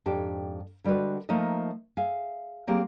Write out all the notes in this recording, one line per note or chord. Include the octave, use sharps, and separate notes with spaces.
F2 G#2 D4 G4 A5
D3 G3 G#3 F#4 B4
F3 A3 A#3 D#4 D#5
G#4 E5 F5 G#5
F#3 A#3 C4 G4 G#4